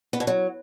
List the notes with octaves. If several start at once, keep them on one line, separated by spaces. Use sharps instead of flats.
B3
B2
F#3